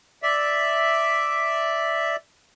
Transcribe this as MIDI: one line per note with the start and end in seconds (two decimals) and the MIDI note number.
0.23 2.16 74
0.23 2.16 76